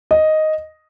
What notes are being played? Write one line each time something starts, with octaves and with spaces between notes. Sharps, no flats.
D#5